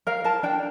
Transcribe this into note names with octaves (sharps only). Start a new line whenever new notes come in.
A#4 F5
A#4 A5
D4 G5